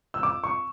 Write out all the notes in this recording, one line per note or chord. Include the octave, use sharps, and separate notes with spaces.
E6
D6
C#6